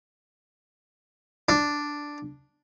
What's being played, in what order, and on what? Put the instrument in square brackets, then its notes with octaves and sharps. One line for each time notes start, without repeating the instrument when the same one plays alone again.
[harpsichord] D4